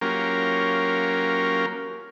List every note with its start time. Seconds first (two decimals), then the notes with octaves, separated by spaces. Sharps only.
0.01 F#3 A#3 C#4 F4 G4 A#4